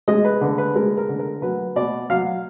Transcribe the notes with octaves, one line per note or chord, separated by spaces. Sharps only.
G#3 D#5
B4
D3 B4
B4
G#3 A#4
A#4
D3
A#4
F#3 B4
B2 D5
F#3 F5